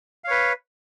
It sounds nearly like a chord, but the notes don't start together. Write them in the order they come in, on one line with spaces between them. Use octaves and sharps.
F5 C#5 B4